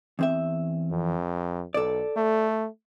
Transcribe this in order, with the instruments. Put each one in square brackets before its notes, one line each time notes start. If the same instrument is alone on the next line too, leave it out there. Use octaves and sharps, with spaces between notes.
[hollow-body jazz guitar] E2 C4 E5
[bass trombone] F2
[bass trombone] B1 [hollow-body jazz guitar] A4 D5
[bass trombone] A3